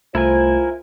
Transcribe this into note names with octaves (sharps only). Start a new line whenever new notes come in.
C2 A3 E4 F4 A#4 C5 G#5